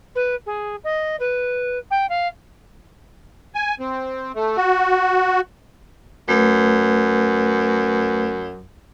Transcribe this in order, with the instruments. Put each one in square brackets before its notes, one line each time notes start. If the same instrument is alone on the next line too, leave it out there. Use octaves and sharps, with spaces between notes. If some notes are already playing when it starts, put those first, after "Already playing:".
[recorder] B4
G#4
D#5
B4
G5
F5
[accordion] G#5
C4
A3
F#4
[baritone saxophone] F#2 [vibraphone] A3 B4